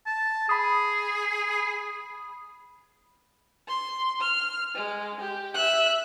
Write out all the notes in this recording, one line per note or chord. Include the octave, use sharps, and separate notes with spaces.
A5
G#4 B5 D#6
C6
F6
G#3
G4
E5 F#6